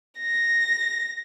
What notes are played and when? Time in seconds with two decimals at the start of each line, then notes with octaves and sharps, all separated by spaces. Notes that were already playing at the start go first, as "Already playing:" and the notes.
0.20 A#6